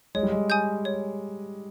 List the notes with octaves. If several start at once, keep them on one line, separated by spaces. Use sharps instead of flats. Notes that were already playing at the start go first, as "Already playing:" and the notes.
G#3 C#5
G3
G#3
G#5 D#6 G6
C#5